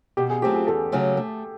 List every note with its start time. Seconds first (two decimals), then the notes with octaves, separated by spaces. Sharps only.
0.17 B2 G4
0.30 G#4
0.42 F#3 A3 C4 F4 G4
0.54 G#4
0.67 E2 A4
0.92 C#3 F#3 A3 C#4
1.17 A3